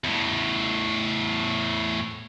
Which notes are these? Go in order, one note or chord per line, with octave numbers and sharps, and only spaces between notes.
E2 A2